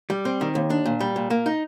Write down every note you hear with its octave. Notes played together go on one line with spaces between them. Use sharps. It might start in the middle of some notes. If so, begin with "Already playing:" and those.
G3
C4
D#3
D#2
D4
A#2
G3
A#2
A#3
D#4